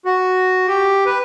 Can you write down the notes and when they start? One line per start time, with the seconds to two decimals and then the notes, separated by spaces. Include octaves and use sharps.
0.05 F#4
0.68 G4
1.06 B4